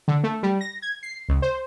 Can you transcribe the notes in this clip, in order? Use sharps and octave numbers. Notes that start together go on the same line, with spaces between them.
D3
A3
G3
A#6
G#6
C7
C#2
C5